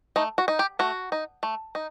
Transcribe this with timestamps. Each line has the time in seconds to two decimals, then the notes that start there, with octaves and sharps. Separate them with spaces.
0.16 A3 D#4
0.38 F#4
0.48 D#4
0.59 G4
0.79 A3 F#4
1.12 D#4
1.43 A3
1.75 D#4